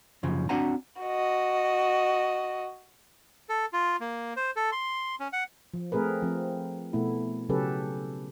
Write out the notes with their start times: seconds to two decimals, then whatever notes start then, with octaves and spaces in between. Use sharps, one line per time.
0.23 F#2 C#3 F3
0.49 C4 D4 F#4 F#5 G#5 A#5
1.02 F#4 D#5
3.49 A4
3.73 F4
4.01 A#3
4.37 C5
4.56 A4
4.72 C6
5.20 C#4
5.33 F#5
5.74 F3
5.92 A3 C4 G#4 A#4 B4
6.22 F3 C4
6.93 B2 A3 B3 E4
7.49 C#3 F#3 C#4 G4 A4 B4